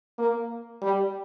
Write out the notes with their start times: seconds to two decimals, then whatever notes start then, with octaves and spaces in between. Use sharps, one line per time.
0.19 A#3
0.82 G3